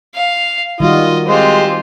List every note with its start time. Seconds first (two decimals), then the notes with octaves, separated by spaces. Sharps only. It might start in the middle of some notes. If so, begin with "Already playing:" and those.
0.15 F5
0.80 D#3 G3 F4 F#4 D#5
1.28 G#3 C4 F4 G4 C5